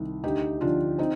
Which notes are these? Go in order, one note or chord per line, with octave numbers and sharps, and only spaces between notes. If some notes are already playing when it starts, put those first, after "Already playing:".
Already playing: C2 D#3
D2 D#4 G4
D3 F3 D4 F4
C4 D#4